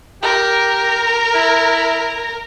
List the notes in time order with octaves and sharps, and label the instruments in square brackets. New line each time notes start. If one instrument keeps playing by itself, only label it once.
[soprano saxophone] G4 [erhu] A#4
[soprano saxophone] E4